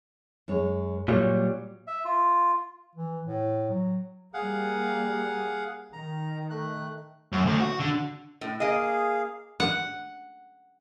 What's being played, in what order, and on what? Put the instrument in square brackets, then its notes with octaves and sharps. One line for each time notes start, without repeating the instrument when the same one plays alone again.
[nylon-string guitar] F#2 G#3 C#5
[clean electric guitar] A#2 F#3 G3 [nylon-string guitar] C#5
[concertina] E5
F4
[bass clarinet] E3
A2
F#3
[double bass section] G3 A#3 [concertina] G#4 F5 F#5
[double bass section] D#3 [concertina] A#5
[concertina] A3 F#6
[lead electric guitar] F#2
D2
F#4
D3
[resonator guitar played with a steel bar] A2
[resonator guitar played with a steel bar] A#3 D#5 [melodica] G#4 F5
[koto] F#5